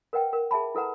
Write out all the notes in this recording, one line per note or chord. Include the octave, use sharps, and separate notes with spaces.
A#4 B4 D#5 F#5 G5
A#4
G#4 E5 A5 B5
E4 A4 B4 F#5 A#5